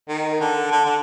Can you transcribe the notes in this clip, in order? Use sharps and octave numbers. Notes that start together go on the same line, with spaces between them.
D#3
D3
D3
D3